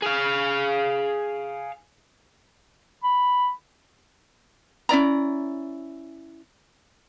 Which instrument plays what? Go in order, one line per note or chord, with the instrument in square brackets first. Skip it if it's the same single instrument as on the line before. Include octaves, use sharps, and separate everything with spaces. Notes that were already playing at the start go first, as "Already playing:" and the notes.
[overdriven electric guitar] G#4 F5
[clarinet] B5
[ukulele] C#4 E4 D5 A#5